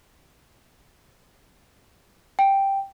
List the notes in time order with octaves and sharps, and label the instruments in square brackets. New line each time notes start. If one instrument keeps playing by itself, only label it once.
[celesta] G5